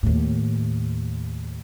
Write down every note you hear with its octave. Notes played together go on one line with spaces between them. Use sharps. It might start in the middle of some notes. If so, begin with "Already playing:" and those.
D#2 A2